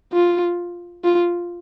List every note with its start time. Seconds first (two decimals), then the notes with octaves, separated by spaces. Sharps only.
0.13 F4
1.04 F4